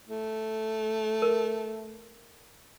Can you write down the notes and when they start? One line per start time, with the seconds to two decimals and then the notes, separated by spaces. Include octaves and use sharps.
0.08 A3
1.22 A#4